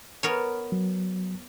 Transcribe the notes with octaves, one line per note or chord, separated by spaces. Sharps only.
B3 A#4 C#5
F#3